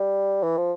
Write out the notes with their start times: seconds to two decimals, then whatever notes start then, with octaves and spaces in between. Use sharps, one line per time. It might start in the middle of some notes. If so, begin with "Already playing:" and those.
Already playing: G3
0.43 E3
0.57 F3